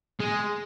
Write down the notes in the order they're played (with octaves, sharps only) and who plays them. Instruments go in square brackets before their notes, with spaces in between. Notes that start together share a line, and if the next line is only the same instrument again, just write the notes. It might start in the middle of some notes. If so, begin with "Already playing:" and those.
[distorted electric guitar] G#3